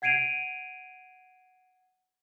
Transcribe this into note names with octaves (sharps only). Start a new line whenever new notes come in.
F#5 G#6 C7 D7 D#7 F7